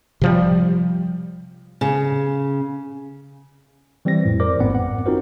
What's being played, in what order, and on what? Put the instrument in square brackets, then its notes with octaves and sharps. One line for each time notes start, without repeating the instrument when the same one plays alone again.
[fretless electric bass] C3 F3 G3
[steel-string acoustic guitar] C#3
[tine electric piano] E3 G3 C4 C5 A#6
F2 A2
A#4 C5 D5 D6
G#1 F2 G#2 B3 C4 F#5
F#5
C4 D#4 F4 F#4 A#4 C5